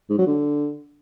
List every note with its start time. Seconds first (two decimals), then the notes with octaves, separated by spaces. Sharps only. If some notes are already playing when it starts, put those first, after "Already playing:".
0.10 G#2
0.18 F#3
0.27 D3